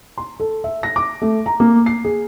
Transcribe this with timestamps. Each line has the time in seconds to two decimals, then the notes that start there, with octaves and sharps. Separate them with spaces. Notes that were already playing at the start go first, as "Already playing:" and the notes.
0.18 C6
0.40 A4
0.64 E5
0.83 A#6
0.96 D6
1.22 A3
1.46 A#5
1.60 A#3
1.86 C7
2.04 G#4